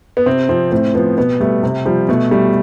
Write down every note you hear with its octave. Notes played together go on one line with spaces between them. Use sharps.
B3
C3 C4
F3 C4
A2 C4
F3 B3
B2 B3
G3 A3
C3
F3 G3
B2 A3
G3 A3